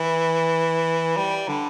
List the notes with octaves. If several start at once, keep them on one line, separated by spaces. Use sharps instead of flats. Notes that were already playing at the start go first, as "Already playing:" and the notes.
Already playing: E3
G3
D3